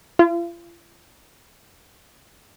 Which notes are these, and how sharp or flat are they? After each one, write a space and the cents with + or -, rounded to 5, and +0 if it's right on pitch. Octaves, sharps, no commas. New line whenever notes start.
F4 -40